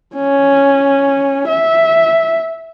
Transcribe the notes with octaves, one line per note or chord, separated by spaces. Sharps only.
C#4
E5